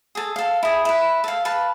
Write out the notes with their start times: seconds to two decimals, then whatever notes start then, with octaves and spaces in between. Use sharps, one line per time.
0.15 G#4 A4
0.36 A4 F5
0.63 E4 G#4
0.85 E4 B4
1.24 A4 F5
1.45 B4 F5 A5